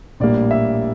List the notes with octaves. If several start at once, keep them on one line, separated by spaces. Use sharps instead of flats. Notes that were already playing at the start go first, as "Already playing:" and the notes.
A#1 A2 G3 A#3 D5
E5